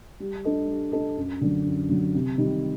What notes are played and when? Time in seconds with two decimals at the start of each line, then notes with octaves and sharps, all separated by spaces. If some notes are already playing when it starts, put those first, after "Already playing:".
0.20 G3
0.45 D4 A4 D#5
0.68 G3
0.92 D4 A4 D#5
1.17 F#2
1.41 D3 F#3
1.66 F#2
1.90 D3 F#3
2.15 C3
2.38 D#3 G3